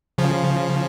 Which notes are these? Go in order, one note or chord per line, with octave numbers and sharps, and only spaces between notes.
C#3 F3